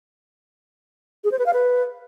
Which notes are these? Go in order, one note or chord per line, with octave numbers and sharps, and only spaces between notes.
G#4
C5
B4
F5
B4